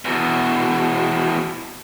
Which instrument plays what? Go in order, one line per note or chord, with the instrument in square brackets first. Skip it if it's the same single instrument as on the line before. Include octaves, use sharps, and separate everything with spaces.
[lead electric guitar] E2 B2